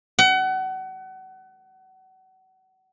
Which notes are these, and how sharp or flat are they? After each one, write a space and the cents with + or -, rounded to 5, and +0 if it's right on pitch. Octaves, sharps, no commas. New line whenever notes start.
F#5 +30